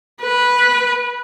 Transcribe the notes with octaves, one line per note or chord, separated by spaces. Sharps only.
B4